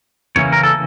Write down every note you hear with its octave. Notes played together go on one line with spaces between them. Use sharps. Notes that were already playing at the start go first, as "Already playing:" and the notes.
C#3 E3 A#3 C#4 C#5
A#4
A4